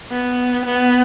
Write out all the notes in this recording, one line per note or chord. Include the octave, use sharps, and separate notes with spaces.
B3
B3